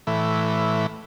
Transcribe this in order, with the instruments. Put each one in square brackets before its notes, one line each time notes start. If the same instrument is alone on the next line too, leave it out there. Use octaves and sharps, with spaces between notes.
[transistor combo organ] A2 E3